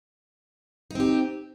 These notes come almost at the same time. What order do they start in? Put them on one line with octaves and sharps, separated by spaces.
D#4 C4 G4